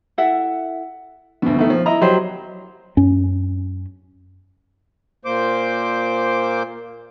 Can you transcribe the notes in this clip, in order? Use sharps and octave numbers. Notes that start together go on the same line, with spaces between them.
E4 A4 E5 F#5
D2 B2
B2 D#3 A3
F3
E4 D#5 A#5
F#3 G4 C5 D#5 C6
F#2 C#4
A#2 A#3 C5 D6